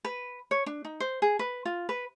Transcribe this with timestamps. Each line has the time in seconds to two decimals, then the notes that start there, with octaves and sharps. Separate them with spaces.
0.05 B4
0.51 C#5
0.66 D4
0.85 D#4
1.00 C5
1.22 G#4
1.39 B4
1.65 F4
1.89 B4